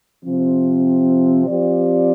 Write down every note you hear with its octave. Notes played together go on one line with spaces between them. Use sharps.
C3 F3 C4
F3 C4 G4 D5